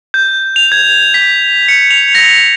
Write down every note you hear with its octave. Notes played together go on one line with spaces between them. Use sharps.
G6
F7
G#6
B6
C#7
F7
A#6